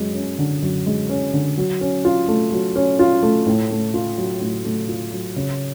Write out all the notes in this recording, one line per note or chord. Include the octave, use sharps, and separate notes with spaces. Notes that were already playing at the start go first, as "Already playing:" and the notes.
Already playing: F#2 G#3
C#4
D3
F#2
G#3
C#4
D3
F#3
C#4
F4
A3
F#3
C#4
F4
A3
A2
A3
F4
F#3
A2
A3
F4
F#3
C#3